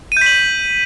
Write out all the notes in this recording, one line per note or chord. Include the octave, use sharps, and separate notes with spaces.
G6 B6 D#7 F#7